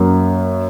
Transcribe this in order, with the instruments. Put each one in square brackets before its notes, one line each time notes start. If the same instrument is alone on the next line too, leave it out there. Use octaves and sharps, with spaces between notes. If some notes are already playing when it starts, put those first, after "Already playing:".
Already playing: [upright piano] F#2 F#3 A#3